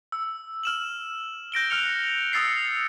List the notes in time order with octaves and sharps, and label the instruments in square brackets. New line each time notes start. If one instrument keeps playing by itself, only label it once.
[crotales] E6
F6 E7 F#7
G6 A#6 D7 G7
F6 F#6 C#7 F7
D#6 E6 A6 C7 C#7